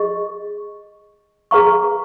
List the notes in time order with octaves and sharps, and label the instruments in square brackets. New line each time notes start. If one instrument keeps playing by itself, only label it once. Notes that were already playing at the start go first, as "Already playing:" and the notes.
Already playing: [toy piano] G#4 D#5 C#6
G#4 B4 F5 A#5 C#6